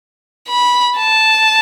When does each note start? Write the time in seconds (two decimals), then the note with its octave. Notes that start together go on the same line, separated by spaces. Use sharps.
0.49 B5
0.97 A5